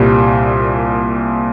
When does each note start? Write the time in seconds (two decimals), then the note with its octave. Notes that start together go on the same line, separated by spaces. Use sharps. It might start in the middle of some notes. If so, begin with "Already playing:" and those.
Already playing: C2 A#2 G3